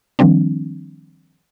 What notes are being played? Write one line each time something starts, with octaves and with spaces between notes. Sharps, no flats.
D#3 F3 G3 C4 D4